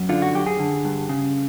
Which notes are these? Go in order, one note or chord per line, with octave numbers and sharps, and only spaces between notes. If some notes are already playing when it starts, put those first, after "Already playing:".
Already playing: F#2
D3 F4
F#4
F#2 G4
G#4
D3
G2
C#3